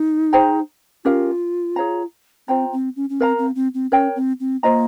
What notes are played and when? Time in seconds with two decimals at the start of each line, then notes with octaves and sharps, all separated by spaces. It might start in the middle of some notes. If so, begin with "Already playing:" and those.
Already playing: D#4
0.33 G#4 C5 G5 A#5
1.05 C#4 F4 G4 A#4 F5
1.76 G#4 C#5 F5 A#5
2.48 C4 F4 C5 G5 A#5
2.72 C4
2.96 C#4
3.10 C#4
3.20 C4 A#4 F5 A#5
3.39 C4
3.55 C4
3.74 C4
3.91 C#4 A#4 C#5 G5
4.16 C4
4.40 C4
4.63 A#3 F4 C5 D#5 A#5